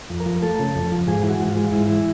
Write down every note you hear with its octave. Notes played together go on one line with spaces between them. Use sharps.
F2
A#4
F3
A3 A4
C#3
F2
F3
G#2 G#4
E3
F#4
G#2
F4
G#3
G#2 E4
E3